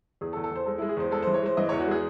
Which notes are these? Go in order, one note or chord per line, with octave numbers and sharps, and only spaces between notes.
E2 G#4
A4
E2
A4
E2 C5
G#3 A4
G#3 E4
G#4
E2 C5
G#3 A4
E3 C5
C#5
G#3 C5
E3 D#5
E2 C#5
F#4
G#3 G#4